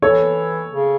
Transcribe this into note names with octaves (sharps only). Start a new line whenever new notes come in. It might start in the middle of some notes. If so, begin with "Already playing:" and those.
E3 A4 C#5
C#3